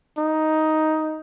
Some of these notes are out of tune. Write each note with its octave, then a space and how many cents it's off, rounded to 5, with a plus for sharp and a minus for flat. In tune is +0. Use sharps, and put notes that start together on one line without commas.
D#4 +5